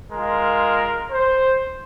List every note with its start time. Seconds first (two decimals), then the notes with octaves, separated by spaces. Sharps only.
0.12 G#3 F4 A#4
1.11 C5